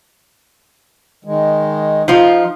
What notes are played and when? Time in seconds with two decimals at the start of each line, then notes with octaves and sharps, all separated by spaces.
1.24 D#3 G#3
2.08 F3 D#4 F4